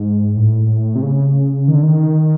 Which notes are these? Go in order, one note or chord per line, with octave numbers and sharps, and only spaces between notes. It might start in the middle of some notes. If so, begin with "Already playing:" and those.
Already playing: G#2
A2
C3
C#3
D#3
D3
D#3